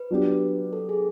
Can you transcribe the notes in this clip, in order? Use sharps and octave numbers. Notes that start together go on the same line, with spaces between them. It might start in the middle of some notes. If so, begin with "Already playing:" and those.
Already playing: B4
F#3 B3 D4 G4
A4
G#4